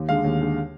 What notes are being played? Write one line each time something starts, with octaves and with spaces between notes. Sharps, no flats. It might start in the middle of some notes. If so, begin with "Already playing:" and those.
Already playing: D#2
D3 G#3 F5
D#2
D3 G#3